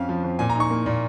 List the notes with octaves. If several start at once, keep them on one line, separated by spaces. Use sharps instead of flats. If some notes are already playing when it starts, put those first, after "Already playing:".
Already playing: F2 C#4 F5
F3
F2
A#2 G#5
A#5
D#4 C#6
A#3
A#2